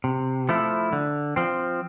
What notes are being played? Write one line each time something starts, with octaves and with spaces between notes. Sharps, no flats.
C3
F3 A3 E4
D3
F3 C4